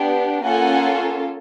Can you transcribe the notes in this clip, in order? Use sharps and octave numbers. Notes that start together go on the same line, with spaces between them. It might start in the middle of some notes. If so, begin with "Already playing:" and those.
Already playing: B3 D4 G4
A#3 C#4 F4 A4 F#5 G#5